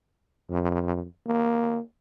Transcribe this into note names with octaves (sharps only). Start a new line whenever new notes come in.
F2
A#3